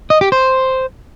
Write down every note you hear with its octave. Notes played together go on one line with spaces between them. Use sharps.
D#5
G4
C5